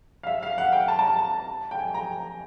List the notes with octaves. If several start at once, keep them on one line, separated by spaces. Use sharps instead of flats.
F5
E5
F5
F#5
G5
A5
A5
A#5
A5
G5
G#5
A#5